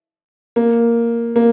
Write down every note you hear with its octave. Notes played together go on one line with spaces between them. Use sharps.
A#3
A#3